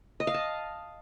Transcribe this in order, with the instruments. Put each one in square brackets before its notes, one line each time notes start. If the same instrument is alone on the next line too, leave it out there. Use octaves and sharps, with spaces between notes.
[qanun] D#5
F5
A5